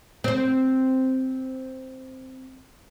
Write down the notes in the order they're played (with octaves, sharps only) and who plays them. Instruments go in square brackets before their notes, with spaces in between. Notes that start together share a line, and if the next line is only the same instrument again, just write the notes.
[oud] C4 C5